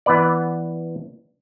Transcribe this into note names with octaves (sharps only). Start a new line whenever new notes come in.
E3 B3 B4 D5